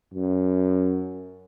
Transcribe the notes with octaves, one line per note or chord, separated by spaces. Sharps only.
F#2